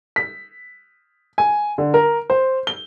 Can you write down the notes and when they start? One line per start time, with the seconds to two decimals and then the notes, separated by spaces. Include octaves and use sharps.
0.16 B6
1.38 G#5
1.78 D3
1.94 A#4
2.30 C5
2.67 G7